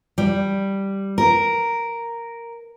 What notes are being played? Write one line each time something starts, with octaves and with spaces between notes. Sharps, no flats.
G3
A#4